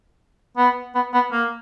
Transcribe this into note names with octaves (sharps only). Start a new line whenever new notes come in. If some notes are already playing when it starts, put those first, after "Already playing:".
B3
B3
B3
A#3